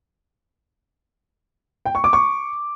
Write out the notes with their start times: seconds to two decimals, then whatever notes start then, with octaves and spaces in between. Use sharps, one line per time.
1.86 G5
1.95 C#6
2.04 D6
2.13 C#6